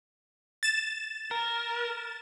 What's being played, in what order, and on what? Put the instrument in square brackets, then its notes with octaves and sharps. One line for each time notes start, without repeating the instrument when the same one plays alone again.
[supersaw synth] A6 E7
[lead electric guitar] A#4